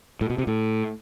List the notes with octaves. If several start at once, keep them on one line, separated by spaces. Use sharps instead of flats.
A2
B2
C3
A2